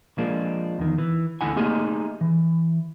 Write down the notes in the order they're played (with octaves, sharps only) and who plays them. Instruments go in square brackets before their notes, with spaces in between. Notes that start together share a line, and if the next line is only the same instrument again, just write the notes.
[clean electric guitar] F3 G#3 A#3 D4
E2 D#3
E3
D2 D3 E4 F#5 G#5
A3 A#3 D#4 G4 G#4
E3